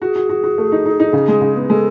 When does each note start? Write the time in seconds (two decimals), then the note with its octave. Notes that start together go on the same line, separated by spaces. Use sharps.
0.01 F#4 G#4
0.16 F#4
0.29 F#4
0.44 F#4
0.58 A3
0.72 D#4
0.86 D#4
1.00 D#4
1.13 C#3
1.28 G#3
1.41 C#3
1.56 B3
1.69 G#3 A4